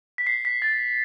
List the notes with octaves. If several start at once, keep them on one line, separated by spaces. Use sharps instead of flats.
B6
C7
B6
A6